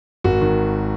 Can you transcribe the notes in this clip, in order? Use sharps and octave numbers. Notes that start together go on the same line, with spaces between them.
G#1 F#4
D#3